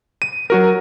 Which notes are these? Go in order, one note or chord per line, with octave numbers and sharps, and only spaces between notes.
D#7
F#3 F#4 A#4